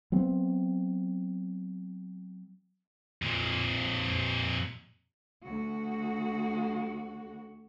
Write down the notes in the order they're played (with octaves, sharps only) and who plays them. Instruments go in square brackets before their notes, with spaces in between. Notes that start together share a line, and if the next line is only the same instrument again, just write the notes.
[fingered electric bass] F#3 B3 C4
[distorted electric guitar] F2 A#2
[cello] D2 F#4